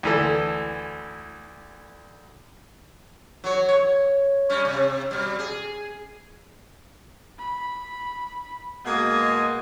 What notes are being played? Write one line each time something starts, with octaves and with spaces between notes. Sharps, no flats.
D2 E3 A4
F#3 C#5
C#5
G3 C#4
C3
B2 G3
G#4
B5
B2 G#3 A#3 D#6 G#6